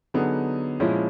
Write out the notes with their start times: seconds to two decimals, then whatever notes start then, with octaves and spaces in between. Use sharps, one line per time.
0.14 D3 F#3 B3 D#4 G#4
0.80 A#2 F3 G#3 C#4 E4